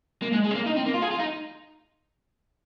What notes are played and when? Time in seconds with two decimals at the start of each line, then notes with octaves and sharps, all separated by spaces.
0.22 A#3
0.33 G#3
0.44 G#3
0.51 C4
0.55 A#3
0.66 D#4
0.76 C4
0.86 A#3
0.94 F4
1.02 G#4
1.11 F4
1.19 D#4